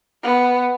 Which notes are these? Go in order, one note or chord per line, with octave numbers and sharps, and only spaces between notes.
B3